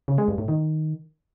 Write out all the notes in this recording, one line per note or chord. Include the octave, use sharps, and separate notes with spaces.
C#3
G#3
G2
A2
D#3